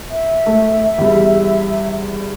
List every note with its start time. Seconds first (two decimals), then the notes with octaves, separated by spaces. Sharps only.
0.10 E5
0.46 A3
0.98 E2 G3